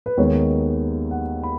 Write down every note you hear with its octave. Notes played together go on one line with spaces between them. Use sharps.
B4
D#2 D#3 G#3 B3 C#5
F#5
B5